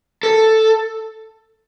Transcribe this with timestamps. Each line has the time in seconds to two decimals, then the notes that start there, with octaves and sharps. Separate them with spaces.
0.23 A4